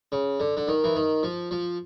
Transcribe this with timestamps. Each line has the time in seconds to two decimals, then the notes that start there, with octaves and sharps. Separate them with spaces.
0.12 C#3
0.40 D3
0.57 D3
0.68 D#3
0.84 E3
0.96 D#3
1.23 F3
1.51 F3